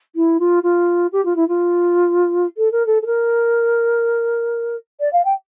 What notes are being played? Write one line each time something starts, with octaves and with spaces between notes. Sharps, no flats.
E4
F4
F4
G4
F4
E4
F4
A4
A#4
A4
A4
A#4
D5
F5
G5